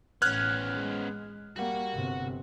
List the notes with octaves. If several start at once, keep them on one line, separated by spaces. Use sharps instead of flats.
A1 B3 C#4 F6 F#6 G#6
G#3
G3 A#3 F#4 F#5
G1 C3